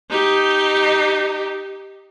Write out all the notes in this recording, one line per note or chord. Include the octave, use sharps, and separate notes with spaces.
D#4 G4